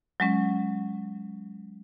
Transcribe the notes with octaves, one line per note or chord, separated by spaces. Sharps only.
F#3 G#3 C#4